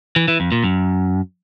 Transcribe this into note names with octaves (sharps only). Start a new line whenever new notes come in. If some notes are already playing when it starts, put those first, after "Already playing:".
E3
E3
F2
A#2
F#2